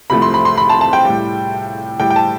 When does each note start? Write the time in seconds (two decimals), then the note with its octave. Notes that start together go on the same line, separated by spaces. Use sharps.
0.10 C2 C3 F3 A3 B5
0.22 C6
0.34 B5
0.45 C6
0.57 B5
0.69 A5
0.81 A5
0.93 G5
1.05 A2 G3
2.00 A2 G3 G5
2.10 G5
2.16 A5